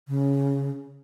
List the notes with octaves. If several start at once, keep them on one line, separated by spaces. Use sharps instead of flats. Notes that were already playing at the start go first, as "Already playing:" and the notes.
C#3